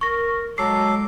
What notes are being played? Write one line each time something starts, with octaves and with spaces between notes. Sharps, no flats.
A#4 C#6 A#6
F#3 G#3 A4 D6 C7